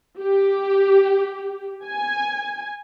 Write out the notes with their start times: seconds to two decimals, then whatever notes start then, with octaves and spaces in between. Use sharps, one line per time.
0.20 G4
1.86 G#5